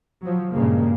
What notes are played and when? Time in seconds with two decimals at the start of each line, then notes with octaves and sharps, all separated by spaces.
0.22 F3 F#3
0.52 G2 A#2 C#3 G#3 A#3